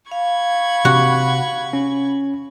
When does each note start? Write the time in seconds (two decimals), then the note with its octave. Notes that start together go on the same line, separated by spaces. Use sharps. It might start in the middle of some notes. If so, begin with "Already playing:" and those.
0.12 F5 B5 C#6 G#6
0.85 C3 F#4
1.73 C#4